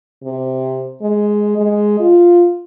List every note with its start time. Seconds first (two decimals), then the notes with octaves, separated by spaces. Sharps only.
0.24 C3
1.01 G#3
1.57 G#3
2.00 F4